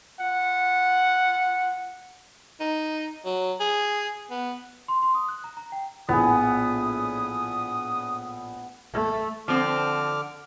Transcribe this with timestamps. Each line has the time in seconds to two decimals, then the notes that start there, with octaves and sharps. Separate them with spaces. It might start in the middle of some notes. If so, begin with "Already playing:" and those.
0.20 F4 F#5
2.60 D#4
3.25 F#3
3.60 G#4
4.30 B3
4.88 C6
5.02 C6
5.15 D#6
5.29 F#6
5.44 A#5
5.57 A#5
5.72 G5
6.09 A#1 A2 B3 G#4 D#6
8.94 A3
9.48 D3 F3 C4 D6 F6